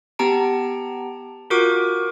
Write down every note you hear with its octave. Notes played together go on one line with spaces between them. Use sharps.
B3 G4 A5 A#5 D7
F4 F#4 A#4 C#6 D6 D7